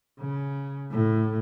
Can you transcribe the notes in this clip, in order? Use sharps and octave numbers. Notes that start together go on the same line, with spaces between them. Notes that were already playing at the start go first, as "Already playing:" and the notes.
C#3
A2